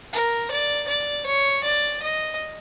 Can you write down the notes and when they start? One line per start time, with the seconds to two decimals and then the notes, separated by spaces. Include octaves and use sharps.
0.13 A#4
0.51 D5
0.88 D5
1.26 C#5
1.64 D5
2.03 D#5